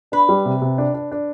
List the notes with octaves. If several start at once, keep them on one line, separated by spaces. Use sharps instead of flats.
D4 B4
G3
C3
C3
D4
D4
D4